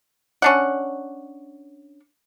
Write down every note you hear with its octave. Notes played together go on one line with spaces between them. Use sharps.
C#4 D4 F#5